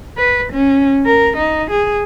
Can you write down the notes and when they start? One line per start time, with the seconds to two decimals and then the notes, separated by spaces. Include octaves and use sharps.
0.17 B4
0.52 C#4
1.05 A#4
1.37 D#4
1.70 G#4